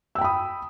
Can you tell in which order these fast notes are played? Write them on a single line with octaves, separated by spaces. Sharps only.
E6 G5 B5 D#6